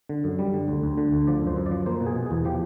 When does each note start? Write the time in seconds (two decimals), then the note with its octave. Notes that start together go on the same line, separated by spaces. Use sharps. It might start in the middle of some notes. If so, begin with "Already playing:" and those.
0.09 D3
0.24 F#2
0.39 G3
0.53 D3
0.68 D2
0.84 D2
0.97 D3
1.12 D2
1.27 F3 D5
1.41 F#2
1.47 C5
1.56 F#2
1.66 D5
1.71 F3
1.86 A#3 C5
2.01 B2
2.06 G#4
2.16 B2
2.26 G#4
2.31 E2
2.45 F3 G4